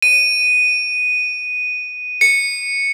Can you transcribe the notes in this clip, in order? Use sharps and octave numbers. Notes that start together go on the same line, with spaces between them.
D#7
C#7